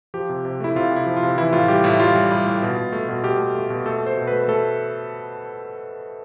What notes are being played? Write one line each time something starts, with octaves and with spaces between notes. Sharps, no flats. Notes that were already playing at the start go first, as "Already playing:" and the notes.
F3 G4
C3
C3
A3 E4
C3 F4
C3
E4
F3
F4
C3
E3 E4
A2 F4
G3 G4
A2 E4
G3 F4
G3
G3
A2
B2
B2
A3
B2
B2 G4
A3
A3
B2
A3 A4
A3 C5
B2
A3 B4
A3 A4